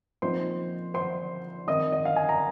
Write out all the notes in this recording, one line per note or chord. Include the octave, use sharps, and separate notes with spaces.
A#2 F3 C4 D#4 C5 C6
C5 C6
D#3 C4 D#4 D#5 D#6
D#5
F5
G#5
A#5